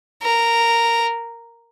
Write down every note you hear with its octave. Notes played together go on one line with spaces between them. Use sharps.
A#4